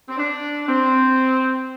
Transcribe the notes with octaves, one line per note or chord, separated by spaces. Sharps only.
C4
D4
C4